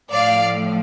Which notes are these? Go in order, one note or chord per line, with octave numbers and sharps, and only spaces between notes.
A2 F3 D5 F5